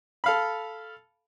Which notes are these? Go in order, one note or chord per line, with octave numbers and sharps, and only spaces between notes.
A4 F5 B5